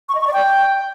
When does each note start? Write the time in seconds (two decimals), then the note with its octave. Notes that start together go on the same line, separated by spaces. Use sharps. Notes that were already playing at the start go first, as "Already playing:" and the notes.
0.09 C#6
0.15 D#5
0.21 C#6
0.27 D5
0.33 G5